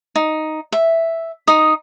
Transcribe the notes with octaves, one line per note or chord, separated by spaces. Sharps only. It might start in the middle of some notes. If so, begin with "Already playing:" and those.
D#4
E5
D#4 D#6